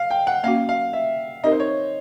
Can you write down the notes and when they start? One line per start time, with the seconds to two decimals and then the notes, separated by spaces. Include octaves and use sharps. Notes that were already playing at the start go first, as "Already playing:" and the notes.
Already playing: F5
0.11 G5
0.27 F#5
0.44 A#3 C#4 F#4 F5
0.69 F5
0.93 E5
1.43 C4 D#4 G4 A#4 D#5
1.52 C5
1.60 C#5